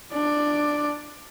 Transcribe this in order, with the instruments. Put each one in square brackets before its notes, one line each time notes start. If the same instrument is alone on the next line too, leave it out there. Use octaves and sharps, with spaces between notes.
[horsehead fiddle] D4 D5